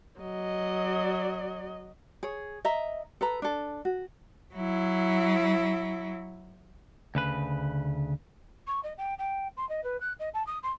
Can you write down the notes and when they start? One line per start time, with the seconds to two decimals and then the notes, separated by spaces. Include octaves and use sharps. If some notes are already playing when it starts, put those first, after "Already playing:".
0.20 F#3 D#5
2.23 G#4 C#5
2.65 D#5 E5 A#5
3.21 A4 B4 A#5
3.42 D4 A4
3.85 F#4
4.54 F#3 E4
7.15 D2 C#3 B4
8.67 C#6
8.83 D#5
8.97 G5
9.18 G5
9.57 C6
9.69 D#5
9.83 B4
10.00 F#6
10.19 D#5
10.33 A5
10.46 D#6
10.63 C6